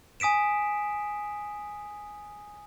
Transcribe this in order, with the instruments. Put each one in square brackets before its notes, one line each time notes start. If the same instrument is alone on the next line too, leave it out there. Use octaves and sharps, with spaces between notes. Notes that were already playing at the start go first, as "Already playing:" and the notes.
[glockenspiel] G#5 D#6 B6 D7 E7